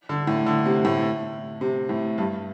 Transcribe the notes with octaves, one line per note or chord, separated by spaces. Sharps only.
D3
A2
D3
C3
A2
C3
A2
G2